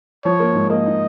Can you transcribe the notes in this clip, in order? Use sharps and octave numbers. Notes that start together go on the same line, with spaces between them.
F3 C#5
A#3
G#2
A#3 D#5
D#4